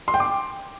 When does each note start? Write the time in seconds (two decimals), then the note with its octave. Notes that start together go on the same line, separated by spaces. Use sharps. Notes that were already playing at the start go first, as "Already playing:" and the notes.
0.08 C6
0.14 G5
0.20 D6